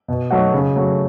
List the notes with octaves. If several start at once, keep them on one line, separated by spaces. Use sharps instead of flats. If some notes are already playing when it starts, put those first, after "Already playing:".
B2
F#3 A3 D#4 F#4
C#3
F#3 A3